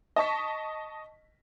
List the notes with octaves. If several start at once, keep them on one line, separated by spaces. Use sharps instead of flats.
D#5 A5 C#6 B6